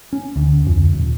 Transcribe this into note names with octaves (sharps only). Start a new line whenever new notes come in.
C#4
D2
F2
D#1